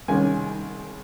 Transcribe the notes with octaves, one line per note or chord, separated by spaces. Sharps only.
C2 C3 D#3 G#3 C#4 G#5